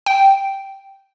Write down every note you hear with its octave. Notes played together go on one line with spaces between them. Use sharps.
G5